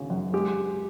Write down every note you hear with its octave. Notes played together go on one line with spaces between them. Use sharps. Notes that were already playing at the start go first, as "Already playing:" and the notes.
Already playing: G#1 C#3
F#2
G#3 G4